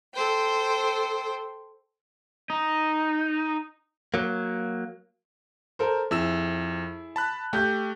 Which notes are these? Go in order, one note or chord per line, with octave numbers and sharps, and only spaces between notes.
A4 C5 G5
D#4
F#3 A#3
A4 A#4 C5
F2 E4 G#4 E6 E7
A5 B5 F#6
A3 G4 G6